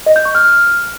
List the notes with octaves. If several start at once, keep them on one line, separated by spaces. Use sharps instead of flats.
D#5
G6
C#6
F6